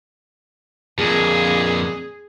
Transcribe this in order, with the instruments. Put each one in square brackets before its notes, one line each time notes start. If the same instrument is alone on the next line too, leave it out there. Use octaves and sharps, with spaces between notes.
[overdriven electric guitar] F2 A#2 [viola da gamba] G#4